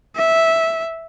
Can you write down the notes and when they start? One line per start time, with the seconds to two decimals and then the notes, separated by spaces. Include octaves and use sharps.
0.16 E5